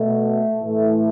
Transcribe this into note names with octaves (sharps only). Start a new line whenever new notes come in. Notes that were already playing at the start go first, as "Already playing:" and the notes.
Already playing: B2 A3
A2 E3